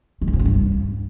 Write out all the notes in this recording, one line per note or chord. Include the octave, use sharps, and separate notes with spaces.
G#3
D#3
G2
C#4
G2